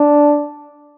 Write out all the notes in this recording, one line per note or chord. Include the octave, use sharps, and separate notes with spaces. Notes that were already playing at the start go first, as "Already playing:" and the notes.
Already playing: D4